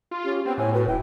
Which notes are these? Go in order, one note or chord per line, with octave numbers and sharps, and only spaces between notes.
F4
C#4 G4
B3 C4 G5
A2 C#5 G#5
F#4 B4
D#1 E4 G5